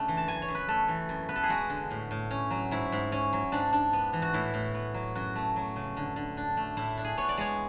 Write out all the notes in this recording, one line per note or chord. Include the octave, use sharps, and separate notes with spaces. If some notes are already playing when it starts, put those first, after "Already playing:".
Already playing: C#3 A3 D4
E3
A5
F#2 G#5
C#5
F#2
B4
A3 A4
E3
F#2
B3 B4
A4
G#4
G#3 F#4
D3
A2
A2
C#4
F#3
G#2 E4
G#2
C#4
F#3
G#2 D4
D4
B3
E3
F#4
A2 E4
A2
B3
F#3
F#2 F#4
A3
F#3
C#3
D3
D3
D4
A3
A2 E4
D4
G#4
B3 C#5
D5
G#3 C#5